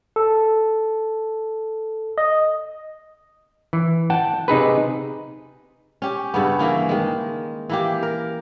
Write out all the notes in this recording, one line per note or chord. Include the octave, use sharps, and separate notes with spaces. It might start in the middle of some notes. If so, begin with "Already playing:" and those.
A4
D#5
E3
F#5 G5 A5
C3 D#4 G#4 B4
C#4 G4
G2 C#3 B3
E3 A#3 C#4
D#3 G#3
E3 A#3 G4
A#4